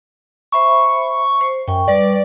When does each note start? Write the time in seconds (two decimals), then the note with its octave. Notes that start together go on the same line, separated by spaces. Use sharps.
0.52 C5 E5 B5 C#6
1.41 C5
1.68 F#2 G5 C#6
1.88 G3 B4 D5